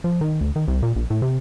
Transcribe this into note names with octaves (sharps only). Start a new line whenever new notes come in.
F3
D#3
D2
D#3
C2
A#2
A#1
A2
C3